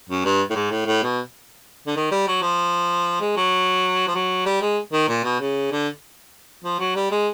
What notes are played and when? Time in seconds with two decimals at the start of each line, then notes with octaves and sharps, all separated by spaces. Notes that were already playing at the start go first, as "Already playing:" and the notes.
0.09 F#2
0.25 G2
0.50 A2
0.55 G#2
0.70 A2
0.86 A2
1.03 B2
1.87 D3
1.96 D#3
2.11 G3
2.28 F#3
2.42 F3
3.21 G#3
3.37 F#3
4.07 F3
4.15 F#3
4.46 G3
4.61 G#3
4.93 D#3
5.09 A#2
5.24 B2
5.40 C#3
5.71 D3
6.64 F3
6.79 F#3
6.96 G3
7.11 G#3